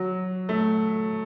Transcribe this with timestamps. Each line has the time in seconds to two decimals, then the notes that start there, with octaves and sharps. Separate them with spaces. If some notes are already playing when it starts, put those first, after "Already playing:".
Already playing: F#3
0.49 A3